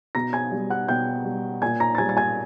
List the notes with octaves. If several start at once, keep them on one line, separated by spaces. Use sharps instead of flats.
B2 A#5 A#6
G#5 G#6
G3
F#5 F#6
B2 G5 G6
G3
A#2 G#5 G#6
A#5 A#6
A6
G3 G#5 G#6
A6
G#5 G#6